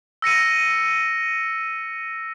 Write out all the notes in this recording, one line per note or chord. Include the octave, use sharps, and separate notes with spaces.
E6 A#6 C#7 D#7